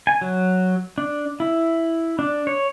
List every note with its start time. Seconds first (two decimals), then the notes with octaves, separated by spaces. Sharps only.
0.07 G#5
0.21 F#3
0.98 D4
1.40 E4
2.19 D4
2.47 C#5